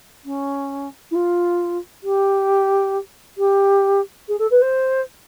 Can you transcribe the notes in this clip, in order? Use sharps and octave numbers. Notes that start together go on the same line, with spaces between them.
C#4
E4
F4
G4
G4
G#4
A4
B4
C5